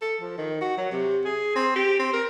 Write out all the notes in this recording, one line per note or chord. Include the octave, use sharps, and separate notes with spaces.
A4
F3
D#3
F#4
F#3
C3
G#4
C4
G4
C4
A#4